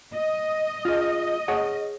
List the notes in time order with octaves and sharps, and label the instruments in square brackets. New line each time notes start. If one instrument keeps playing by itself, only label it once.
[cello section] D#5
[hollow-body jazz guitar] F4 G#4
G#4 C#5 F#5